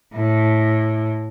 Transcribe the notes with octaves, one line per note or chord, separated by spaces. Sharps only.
A2